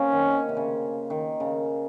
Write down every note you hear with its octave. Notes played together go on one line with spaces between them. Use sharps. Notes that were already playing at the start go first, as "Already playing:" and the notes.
Already playing: A#3 C4 C#4
D#3
C3
C#3
D#3
C#3